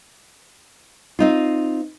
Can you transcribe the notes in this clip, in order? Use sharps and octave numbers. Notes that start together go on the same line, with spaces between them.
C4 D#4 F4